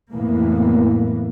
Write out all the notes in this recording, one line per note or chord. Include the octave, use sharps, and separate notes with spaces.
F#1 F2 A2 E3 A#3 B3